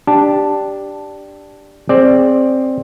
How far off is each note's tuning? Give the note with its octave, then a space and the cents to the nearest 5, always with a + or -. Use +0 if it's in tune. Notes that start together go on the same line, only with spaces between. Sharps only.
D4 +0 G4 +0 A5 +0
C4 +10 G#4 +0 D5 +0